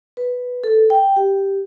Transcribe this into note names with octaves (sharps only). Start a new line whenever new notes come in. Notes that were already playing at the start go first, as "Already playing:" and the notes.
B4
A4
G5
G4